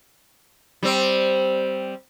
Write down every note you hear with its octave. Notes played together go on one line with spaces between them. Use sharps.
G3 C4